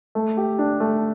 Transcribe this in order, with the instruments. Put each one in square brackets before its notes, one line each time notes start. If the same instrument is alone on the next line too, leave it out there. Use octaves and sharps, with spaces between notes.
[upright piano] A3
G4
D4
A3